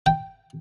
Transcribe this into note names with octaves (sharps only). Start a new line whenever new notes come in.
G5